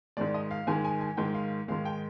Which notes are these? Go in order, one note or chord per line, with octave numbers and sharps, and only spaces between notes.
G#2 D#3 G#3 D5
D#5
F5
G#2 D#3 G#3 G#5
G#5
G#5
G#2 D#3 G#3 G5
F5
G#2 D#3 G#3 F5
G5